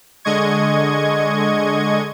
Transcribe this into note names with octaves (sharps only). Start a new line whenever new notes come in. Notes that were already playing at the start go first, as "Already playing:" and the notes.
D3 G#3 D#5 C#6 G#6